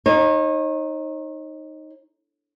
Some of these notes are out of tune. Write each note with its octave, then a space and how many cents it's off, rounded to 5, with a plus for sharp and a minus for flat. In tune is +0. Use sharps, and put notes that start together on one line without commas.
D#4 +0 C#5 -40